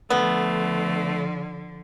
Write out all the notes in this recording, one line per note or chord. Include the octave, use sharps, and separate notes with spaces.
D3 F3 A3 B3